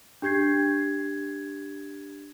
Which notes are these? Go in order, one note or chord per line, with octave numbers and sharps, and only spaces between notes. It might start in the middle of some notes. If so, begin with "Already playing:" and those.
D4 G4 G6 G#6 C7